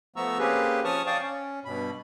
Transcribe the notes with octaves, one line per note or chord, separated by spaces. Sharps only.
F3 A3 B3 A#5 C#6 E6
A#3 C4 C#4 G4 G#4 B4
F3 C#4 A5 C#6 D#6 F6
D5 F5 G5 A5 C#6 D#6
C#4
G2 B2 B5